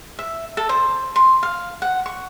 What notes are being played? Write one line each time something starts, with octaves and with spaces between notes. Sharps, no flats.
E5
A4
C5
C6
F5
F#5
C#6